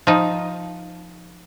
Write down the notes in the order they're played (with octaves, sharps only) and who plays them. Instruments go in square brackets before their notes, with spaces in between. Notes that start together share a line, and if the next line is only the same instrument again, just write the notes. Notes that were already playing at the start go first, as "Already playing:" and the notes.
[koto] F3 D#4